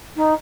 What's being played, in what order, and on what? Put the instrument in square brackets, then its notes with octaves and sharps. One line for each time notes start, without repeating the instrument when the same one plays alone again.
[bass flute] D#4